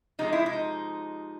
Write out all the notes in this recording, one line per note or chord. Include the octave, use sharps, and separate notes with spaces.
C3 F3 G#3 D#4
E4
D#4